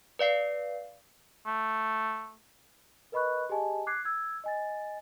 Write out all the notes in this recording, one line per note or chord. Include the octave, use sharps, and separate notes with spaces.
B4 D5 F5 C7
A3
A#4 B4 D#5 B5 C#6 F#6
G4 G#4 D#5 G#5 A5
D6 F#6 G#6 C7
E6 G#6
D#5 G#5 A6